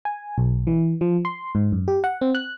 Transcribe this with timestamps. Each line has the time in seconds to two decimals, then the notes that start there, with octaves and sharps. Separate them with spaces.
0.05 G#5
0.38 B1
0.67 E3
1.01 F3
1.25 C6
1.55 G#2
1.72 F#2
1.88 G4
2.04 F#5
2.21 C4
2.35 F#6